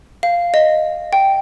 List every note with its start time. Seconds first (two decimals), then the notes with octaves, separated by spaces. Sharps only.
0.23 F5
0.54 D#5
1.13 G5